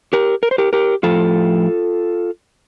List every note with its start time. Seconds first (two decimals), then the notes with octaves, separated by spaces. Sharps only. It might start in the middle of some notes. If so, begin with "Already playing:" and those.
0.13 G4 A#4
0.43 A#4
0.51 C5
0.58 G4 A#4
0.73 G4 A#4
1.03 A2 F3 F4 A4